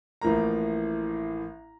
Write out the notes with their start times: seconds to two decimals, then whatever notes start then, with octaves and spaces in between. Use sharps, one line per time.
0.21 A1 A2 F3 A#3 A#5